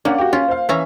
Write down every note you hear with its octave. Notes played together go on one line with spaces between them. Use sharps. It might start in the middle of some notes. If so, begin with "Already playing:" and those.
A#3 C#4 D4 F#5
F#4 G4
C#4 F4
C5 F5
E3 C#4 E5 A#5